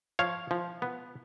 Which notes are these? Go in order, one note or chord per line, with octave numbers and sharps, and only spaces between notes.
F3 C#5 F5
F3
B3